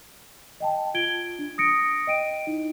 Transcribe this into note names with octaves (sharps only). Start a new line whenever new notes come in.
D#5 G5 A5
F4 G#6 D7 G7
D4
D#6 A#6 C#7 D7
D#5 G5 D7 D#7
D#4 E4